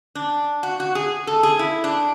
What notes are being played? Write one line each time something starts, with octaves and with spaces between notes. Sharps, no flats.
D4
F#4
F#4
G#4
A4
G#4
E4
D4